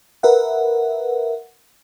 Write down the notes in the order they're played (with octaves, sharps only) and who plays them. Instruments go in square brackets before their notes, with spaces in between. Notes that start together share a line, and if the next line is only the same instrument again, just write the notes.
[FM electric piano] A#4 B4 E5 F#5